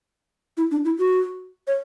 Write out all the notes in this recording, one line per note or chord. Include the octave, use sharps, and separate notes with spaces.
E4
D4
E4
F#4
C#5